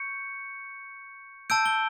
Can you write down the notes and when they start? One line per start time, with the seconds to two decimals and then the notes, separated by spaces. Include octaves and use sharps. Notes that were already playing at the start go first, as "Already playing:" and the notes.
Already playing: C#6 G6 C#7
1.50 A5 E6 G6 D7
1.65 G7